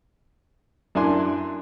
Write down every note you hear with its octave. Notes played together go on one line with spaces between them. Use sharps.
F#2 D4 E4 G#5 C6